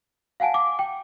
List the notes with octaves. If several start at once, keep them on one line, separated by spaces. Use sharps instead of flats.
F5 F#5 G#5 A5 D7
D6
G5